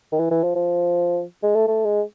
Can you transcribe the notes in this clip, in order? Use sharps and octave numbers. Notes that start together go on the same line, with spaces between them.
D#3
E3
E3
F3
F3
G#3
A3
A3
G#3